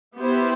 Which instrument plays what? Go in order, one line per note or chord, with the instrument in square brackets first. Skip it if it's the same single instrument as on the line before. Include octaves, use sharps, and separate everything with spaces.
[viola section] B3 E4 G4 C5